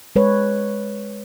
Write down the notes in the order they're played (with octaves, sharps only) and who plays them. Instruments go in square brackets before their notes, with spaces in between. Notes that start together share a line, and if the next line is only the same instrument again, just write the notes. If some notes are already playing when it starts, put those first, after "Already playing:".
[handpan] G#3 B4 C#5